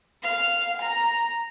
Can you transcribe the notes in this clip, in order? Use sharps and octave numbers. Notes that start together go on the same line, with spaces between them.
F5
A#5